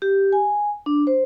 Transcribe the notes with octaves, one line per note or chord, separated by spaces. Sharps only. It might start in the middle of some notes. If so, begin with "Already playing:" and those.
G4
G#5
D4
C5